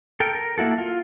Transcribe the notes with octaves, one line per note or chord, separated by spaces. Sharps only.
A4 A#4 G5
A#4
A#3 E4 F#4 A4
F4